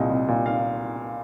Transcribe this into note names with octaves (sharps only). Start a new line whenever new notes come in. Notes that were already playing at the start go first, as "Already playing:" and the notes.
Already playing: C2 A#2 D#5
C2
A#2
F5